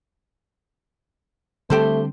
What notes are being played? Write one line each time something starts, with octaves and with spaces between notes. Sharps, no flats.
D3 G3 A3 C4 G4 A4 C5